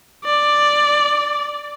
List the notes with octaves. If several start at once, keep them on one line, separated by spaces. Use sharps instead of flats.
D5